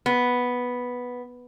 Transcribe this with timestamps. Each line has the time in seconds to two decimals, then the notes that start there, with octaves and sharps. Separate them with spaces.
0.06 B3